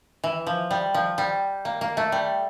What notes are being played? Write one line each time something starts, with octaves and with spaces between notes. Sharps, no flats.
E3
F3
G3
F3
G3
A#3
A#3
A3
G3